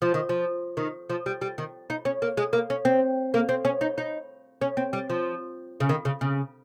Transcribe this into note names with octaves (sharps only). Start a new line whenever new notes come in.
F3
D#3
F3
D#3
F3
G3
G3
D#3
D#4
C#4
A#3
G#3
A#3
C#4
C4
A#3
C4
C#4
D#4
D#4
C#4
C4
G3
F3
C#3
D#3
C#3
C#3